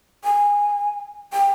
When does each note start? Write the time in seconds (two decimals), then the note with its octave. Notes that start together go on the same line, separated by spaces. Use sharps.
0.24 G#5
1.33 G5